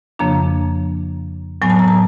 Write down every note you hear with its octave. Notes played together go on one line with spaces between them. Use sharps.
F2 C#3 F3 A#3 D4 A#5
A2 F#3 B3 G#5
A5
A#5
A5